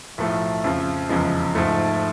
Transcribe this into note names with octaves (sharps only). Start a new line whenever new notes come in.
B1 A2 F3 A3
F2 C#3 F3
F1 E2 C#3 F3 G#3
G#2 F3 A3